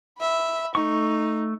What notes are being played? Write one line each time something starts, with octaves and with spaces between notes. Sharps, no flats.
E5 B5
A3 D#4 C#6